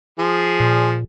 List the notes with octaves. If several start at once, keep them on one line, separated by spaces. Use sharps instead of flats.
F3 G#4
A#2